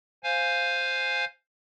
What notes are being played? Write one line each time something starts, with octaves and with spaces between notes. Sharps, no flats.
C5 F5 G#5